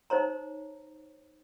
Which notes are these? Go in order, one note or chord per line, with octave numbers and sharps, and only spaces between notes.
D#4 C5 C#5 A#5